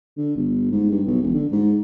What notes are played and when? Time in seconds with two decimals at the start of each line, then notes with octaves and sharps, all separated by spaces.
0.17 D3
0.36 G1
0.71 G#2
0.91 G2
1.07 B1
1.22 E1
1.34 D3
1.52 G#2